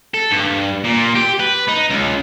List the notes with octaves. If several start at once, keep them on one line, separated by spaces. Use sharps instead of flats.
A4
G2
A#2
G4
B4
D#4
C#2